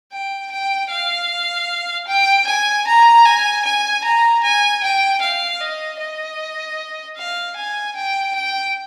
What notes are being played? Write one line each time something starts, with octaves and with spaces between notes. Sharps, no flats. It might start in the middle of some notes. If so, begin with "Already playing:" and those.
G5
G5
F5
G5
G#5
A#5
G#5
G#5
A#5
G#5
G5
F5
D#5
D#5
F5
G#5
G5
G5